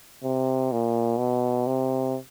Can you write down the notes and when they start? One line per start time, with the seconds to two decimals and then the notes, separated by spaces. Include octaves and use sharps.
0.24 C3
0.72 A#2
1.18 B2
1.67 C3